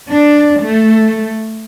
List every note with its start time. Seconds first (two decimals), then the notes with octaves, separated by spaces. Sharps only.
0.11 D4
0.63 A3